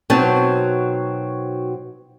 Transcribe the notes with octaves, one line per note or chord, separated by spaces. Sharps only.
B2 F#3 C4 D#4 A5